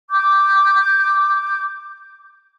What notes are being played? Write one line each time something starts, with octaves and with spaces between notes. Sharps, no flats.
D6 G6